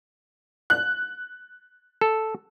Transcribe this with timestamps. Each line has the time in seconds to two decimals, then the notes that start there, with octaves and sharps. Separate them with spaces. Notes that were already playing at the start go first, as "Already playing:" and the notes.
0.70 F#6
2.01 A4